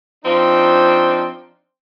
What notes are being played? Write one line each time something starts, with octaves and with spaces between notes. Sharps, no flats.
F3 C4 D4 D#4